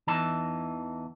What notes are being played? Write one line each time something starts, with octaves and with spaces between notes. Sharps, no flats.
E2 E3 D#4 A5